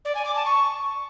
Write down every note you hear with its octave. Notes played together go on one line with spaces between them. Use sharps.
D5
G#5
D6
A5
C#6